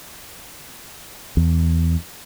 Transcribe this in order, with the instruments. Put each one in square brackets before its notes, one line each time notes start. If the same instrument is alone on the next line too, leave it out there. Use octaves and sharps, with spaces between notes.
[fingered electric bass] E2